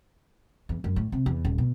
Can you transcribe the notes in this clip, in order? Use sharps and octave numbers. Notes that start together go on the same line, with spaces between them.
E2
F#2
A2
C3
E2
D#1
B2